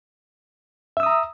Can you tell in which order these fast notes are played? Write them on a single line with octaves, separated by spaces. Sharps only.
E5 E6 D#6 A#5